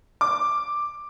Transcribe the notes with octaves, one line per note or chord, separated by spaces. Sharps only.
D6